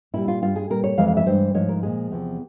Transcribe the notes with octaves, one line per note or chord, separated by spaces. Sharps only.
A#2 G3 E4
F4
G2 G3 F4
G#4
A#2 G3 A#4
C#5
F2 E3 G#3 F5
F5
E5
G2 E3 G#3 C5
G#2 F3 G#3 C#5
A#4
A#2 F3 G#3 G#4
E2 C3 F3